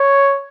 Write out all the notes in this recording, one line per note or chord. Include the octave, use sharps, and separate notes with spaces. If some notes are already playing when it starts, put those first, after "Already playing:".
Already playing: C#5